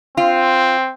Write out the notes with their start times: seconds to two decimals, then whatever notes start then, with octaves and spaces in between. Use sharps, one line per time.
0.17 C4 F4